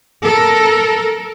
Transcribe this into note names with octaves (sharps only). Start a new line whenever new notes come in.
A4 A#4